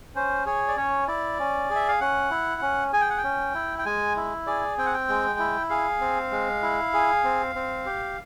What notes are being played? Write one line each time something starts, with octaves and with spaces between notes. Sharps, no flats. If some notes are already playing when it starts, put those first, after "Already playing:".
C#4 C5
G#4 C#5
D5
C#4 C#5
E4 D5
C#4
G#4
E5
F5
C#4 F#5
E4
C#4
G#4 G#5
G5
F#5
G5
C#4
E4
G5
G#3 G#5
E4
G#4 D5
C4 G5
F#5
G5
G#3
E4
G#4 F5
C4
G#3
E4
G#4
C4
C4
G4